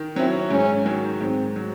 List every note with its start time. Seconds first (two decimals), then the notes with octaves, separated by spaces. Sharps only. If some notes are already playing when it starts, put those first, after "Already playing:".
Already playing: D#3
0.16 F#3 C4 C#4 E4
0.50 G#2 C#4
0.85 D#3 F#3
1.21 G#2 C4
1.56 F#3